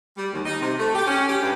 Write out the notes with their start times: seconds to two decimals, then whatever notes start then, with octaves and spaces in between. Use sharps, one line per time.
0.17 G3
0.33 D#2
0.45 D#4
0.60 C3
0.79 A3
0.95 G4
1.07 C#4
1.28 G4
1.42 G2